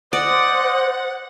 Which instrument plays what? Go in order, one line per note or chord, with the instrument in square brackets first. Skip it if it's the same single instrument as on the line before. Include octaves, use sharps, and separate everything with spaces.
[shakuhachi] C5 [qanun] D5 [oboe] D#5 [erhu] F#5